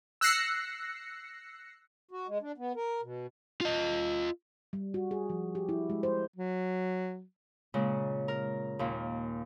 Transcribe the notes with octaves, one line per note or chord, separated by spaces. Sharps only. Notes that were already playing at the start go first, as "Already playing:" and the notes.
E6 F#6 A#6 C7 C#7
F#4
G#3
D4
B3
A#4
B2
F4 D#5
G3
F#4
G#4
F3
G4
E4
G#3
C5
F#3
A#2 C#3 G#3
A#4
D#2 A#2